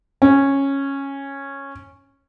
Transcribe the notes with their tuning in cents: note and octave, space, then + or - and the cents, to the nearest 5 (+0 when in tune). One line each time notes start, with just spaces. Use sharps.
C#4 -10